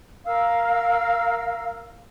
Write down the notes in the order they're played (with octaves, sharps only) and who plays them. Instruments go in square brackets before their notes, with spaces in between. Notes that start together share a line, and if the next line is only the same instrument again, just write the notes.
[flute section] A#4 F5 E6